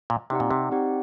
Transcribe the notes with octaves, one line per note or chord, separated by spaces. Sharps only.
A#2
C3 C4 D#4 G4 D5 F#5
A#2
C3
C4 D#4 G4 D5 F#5